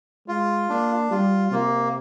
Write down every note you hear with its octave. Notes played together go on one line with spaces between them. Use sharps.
G#3 F4
A#3 D4
G3 F4
C3 A#3